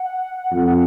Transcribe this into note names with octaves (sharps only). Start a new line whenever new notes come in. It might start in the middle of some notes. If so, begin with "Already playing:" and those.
Already playing: F#5
F2